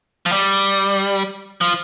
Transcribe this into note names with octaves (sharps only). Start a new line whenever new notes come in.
F3
G3
F3